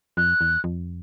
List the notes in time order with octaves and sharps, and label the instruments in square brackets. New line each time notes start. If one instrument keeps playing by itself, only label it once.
[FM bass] F2 [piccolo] F#6
[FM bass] E2
F2